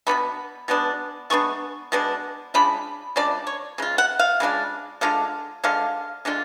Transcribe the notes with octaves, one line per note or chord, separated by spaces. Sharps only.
B2 G#3 B3 D4 B5
B2 G#3 B3 D4
B2 G#3 B3 D4 C#6
B2 G#3 B3 D4
C#3 G#3 D4 F4 B5
C#3 G#3 D4 F4 D5
C#5
C#3 G#3 F4
F#5
F5
C#3 G#3 D4 F4
D3 G#3 D4 F4 F5
D3 G#3 D4 F4 F5
D3 G#3 D4 F4